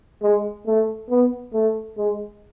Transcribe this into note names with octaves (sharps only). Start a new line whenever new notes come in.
G#3
A3
B3
A3
G#3